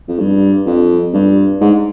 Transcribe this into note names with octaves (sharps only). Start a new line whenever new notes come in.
F2
G2
F2
G2
G#2